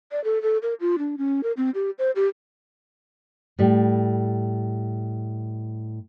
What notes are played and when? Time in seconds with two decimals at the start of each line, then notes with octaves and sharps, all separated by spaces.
0.12 D5
0.24 A4
0.42 A4
0.62 A#4
0.80 F4
0.99 D4
1.18 C#4
1.43 A#4
1.57 C4
1.75 G4
1.99 C5
2.16 G4
3.59 A2 G3